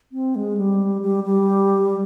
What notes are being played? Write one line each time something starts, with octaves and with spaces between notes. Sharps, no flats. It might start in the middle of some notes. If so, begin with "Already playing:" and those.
C4
G#3
G3
G3
G3